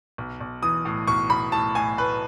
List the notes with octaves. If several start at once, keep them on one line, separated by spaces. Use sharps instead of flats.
B1
B1
E3 D#6
A2
B1 C#6
B1 B5
A2 A5
A2 G#5
A2 B4